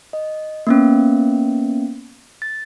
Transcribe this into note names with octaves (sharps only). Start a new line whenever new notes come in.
D#5
A#3 B3 C#4
A6